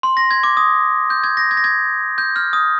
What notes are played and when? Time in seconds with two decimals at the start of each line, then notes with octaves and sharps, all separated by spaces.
0.03 C6
0.17 A#6
0.31 G#6
0.43 D6
0.57 D#6
1.10 G6
1.24 G#6
1.37 A#6
1.51 G#6
1.57 A#6
1.64 G#6
2.18 G6
2.36 F6
2.53 D#6